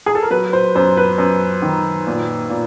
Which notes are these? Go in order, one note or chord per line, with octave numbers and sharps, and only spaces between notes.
G#4
A4
A#4
F#3 B4
C5
F#2 C5
B4
F#2
D#3
A#2
A#2